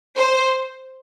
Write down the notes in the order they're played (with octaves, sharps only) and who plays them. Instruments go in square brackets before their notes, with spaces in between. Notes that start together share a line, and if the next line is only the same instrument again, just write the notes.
[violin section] C5